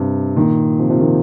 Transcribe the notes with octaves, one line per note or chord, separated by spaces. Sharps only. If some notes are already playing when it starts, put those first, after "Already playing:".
Already playing: G2 C3
A#2 D#3
C3 F3
C3 F3
A#2 D#3